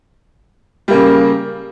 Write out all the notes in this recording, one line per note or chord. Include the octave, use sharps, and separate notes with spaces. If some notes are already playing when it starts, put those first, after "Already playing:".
C#3 G3 A#3